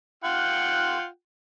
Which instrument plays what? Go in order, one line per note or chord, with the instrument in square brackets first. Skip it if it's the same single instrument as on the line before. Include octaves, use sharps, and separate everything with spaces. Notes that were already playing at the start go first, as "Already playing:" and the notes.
[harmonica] F4 F#5 G5